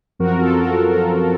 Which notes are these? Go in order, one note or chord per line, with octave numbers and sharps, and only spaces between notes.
F#2 F3 C4 F#4 A#4
F4 A4
F#4 A#4